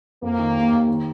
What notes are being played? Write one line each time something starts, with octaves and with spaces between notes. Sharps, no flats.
F2 A#3
D#3
D#2
D#2
D#3